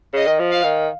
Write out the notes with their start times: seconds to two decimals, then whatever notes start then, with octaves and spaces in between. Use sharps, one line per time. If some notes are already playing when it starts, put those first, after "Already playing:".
0.13 C#3 D#5
0.27 D#3
0.40 F3
0.51 F5
0.64 D#3